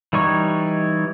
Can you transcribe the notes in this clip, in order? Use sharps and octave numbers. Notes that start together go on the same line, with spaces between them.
E3 G3 D#4 C#5 C#6